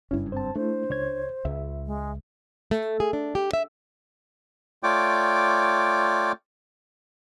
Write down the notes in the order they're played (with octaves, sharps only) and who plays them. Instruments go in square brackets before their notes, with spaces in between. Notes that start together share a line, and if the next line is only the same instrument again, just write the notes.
[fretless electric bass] F#1 G2 [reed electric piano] C#4 E4
[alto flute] C4 [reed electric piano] C5 A5
[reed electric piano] A3 E4 [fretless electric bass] D4 [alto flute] C5
[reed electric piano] C#2 C#5 G#6
[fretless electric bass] C#2 [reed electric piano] E5
[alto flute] G#3
[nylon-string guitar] A3
G#4
D4
G4
E5
[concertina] A3 F4 C#5 D5 G5 D6